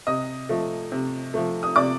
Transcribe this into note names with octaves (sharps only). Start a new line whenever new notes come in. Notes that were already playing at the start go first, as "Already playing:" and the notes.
C3 D#5 D#6
F3 A3
C3
F3 A3
D#6
C3 D5 D6